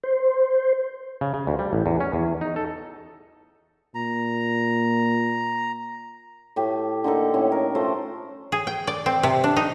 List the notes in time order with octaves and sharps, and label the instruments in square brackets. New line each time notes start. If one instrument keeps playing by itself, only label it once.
[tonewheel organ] C5
[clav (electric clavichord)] C#3
C#3
D2
G3
A1
E2
C#4
E2
D#4
A4
[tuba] A#2 [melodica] A#5
[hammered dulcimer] A2 A3 G4
D3 A#3 D#4 A4
A2 C#4
A#4
F3 A3 C5
[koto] G#4
G5
D5
C4
C3
D4
D#4